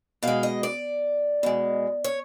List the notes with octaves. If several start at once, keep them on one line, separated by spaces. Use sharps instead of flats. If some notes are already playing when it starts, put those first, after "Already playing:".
B2 G#3 F5
D#5
D5
B2 G#3
C#5